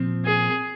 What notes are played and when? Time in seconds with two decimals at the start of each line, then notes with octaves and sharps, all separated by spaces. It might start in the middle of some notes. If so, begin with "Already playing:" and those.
Already playing: A#2 F3 C4
0.25 G#4